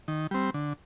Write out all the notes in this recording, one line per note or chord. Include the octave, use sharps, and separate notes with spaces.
D#3
G3 C4
D3